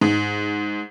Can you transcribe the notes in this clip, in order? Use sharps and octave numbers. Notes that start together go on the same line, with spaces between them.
G#2